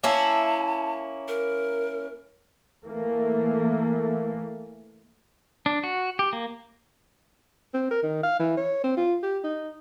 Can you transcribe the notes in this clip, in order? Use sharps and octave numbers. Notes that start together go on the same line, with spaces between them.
A#3 C#4 E4 A5
A#4
E3 A3 A#3
D4
F#4
G4
A#3
C4
A#4
D#3
F5
E3
C#5
C4
F4
G4
D#4